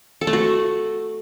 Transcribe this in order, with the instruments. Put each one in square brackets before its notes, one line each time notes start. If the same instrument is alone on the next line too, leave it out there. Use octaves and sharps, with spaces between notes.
[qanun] A4
A3
F#4